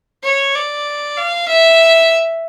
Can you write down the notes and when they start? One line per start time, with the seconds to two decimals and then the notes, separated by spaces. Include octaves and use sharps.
0.24 C#5
0.55 D5
1.17 F5
1.48 E5